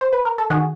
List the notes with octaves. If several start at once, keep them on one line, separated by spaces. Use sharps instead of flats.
C5
B4
A#4
A4
D#3 F#4 G#4